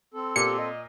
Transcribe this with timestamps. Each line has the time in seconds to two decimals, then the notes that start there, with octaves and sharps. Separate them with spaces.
0.14 C4 A4
0.36 A#2 G4 C#7
0.59 D#5